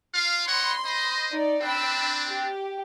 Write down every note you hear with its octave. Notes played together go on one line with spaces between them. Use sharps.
F4 F5
C#5 D#5 F#5 B5 C6
C5 D#5
D#4 D5
C4 D4 G5 B5 E6
G4